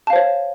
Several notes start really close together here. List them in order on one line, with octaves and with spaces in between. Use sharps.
A5 F5 C5 C#5